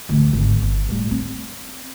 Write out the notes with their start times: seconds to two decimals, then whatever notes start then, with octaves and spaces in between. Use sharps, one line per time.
0.09 A1 D2
0.33 G#1
0.62 G1
0.89 A2 G3
1.11 C4